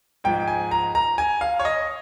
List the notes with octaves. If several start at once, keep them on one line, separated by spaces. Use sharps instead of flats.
G#2 F3 G#3 G5
G#5
A#5
A#5
G#5
F5
C#5
D#5